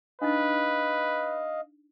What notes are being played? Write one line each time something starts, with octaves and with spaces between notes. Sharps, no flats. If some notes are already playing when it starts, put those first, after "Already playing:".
D4 D#4 B4 D#5 F5